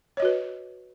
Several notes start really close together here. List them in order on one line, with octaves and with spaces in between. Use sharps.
C#5 D#5 F#4 B4